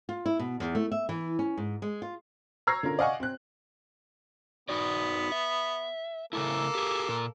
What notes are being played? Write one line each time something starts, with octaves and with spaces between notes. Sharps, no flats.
F4
E4
B2
E2
A3
E5
E3
C#4
G#2
G#3
F4
A#5 C#6 E6 G#6 A#6 C7
D3 C#4 F4 A#4
D5 D#5 F5 F#5 G#5 C#6
C4 F#6
B3 D#4 F#4 D5
E5
C#3 A3 A#3 E4 A4
G4 G#4
A#2 A#4